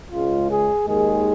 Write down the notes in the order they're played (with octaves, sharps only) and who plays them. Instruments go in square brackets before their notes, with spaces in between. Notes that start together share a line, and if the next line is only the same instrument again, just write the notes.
[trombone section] C#2 C#3 G#3 F4
G#4
D#2 D#3 G#3 G#4